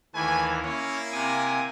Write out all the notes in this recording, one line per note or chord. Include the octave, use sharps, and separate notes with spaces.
D#2 E3 A3 B4 G#5
A#3 C#4 E4
C3 G#5 D#6